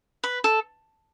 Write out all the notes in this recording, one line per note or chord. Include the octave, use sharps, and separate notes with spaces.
B4
A4